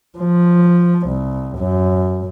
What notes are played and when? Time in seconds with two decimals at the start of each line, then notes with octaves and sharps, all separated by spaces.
0.18 F3
1.07 C2
1.58 F#2